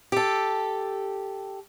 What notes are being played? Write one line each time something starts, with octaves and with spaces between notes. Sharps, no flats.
G4 A4